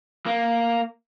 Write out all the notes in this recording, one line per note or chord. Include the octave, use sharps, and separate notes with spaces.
A#3